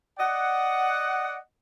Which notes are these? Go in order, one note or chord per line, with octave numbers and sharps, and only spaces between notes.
D5 D#5 F#5